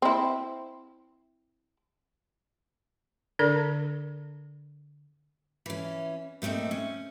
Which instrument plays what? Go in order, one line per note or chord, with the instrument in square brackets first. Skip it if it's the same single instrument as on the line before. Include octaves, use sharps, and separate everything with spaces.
[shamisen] C4 E4
[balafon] D3 D4 A4 A#4 D5
[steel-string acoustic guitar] E3 C#4
A#2 A3 A#3 C4 D#4
C#4